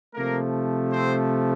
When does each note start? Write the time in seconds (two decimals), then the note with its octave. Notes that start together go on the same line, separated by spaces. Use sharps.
0.15 C3 F3 A3 A#3 A#4
0.91 C4 C5